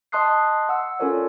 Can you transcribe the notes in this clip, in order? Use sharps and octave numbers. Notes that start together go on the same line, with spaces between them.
D#5 A5 C6 D#6 F#6 C7
F#5 E6
C#4 F4 A4 A#4 C#5 D5